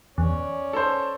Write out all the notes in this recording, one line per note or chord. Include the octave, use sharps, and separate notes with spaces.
E2 C#4 C#5 D5
A4 C5